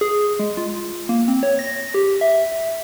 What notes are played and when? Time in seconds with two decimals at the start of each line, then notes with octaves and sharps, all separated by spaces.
0.01 G#4
0.39 G#3
0.57 F4
1.09 A#3
1.28 C4
1.43 C#5
1.59 A#6
1.94 G4
2.21 E5